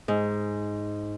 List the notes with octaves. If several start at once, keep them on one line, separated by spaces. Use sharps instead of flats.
G#2